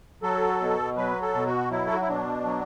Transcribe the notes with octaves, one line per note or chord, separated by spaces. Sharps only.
F#3 A4
B2
F#3 B4
A4
B2
F#4
F#3 E4
A4
F#4
E4
B2 D4
F#3